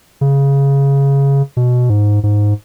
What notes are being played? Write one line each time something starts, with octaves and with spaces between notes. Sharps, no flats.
C#3
B2
G#2
G#2